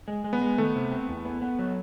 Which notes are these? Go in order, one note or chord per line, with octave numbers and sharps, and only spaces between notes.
G#3
G#3
B3
G#3
D#3 A3
C3
C4
E2
B3
B3
F#3